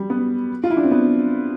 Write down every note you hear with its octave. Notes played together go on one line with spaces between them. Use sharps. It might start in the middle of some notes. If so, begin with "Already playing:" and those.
Already playing: G3
B3
F4
E4
D4
C4
B3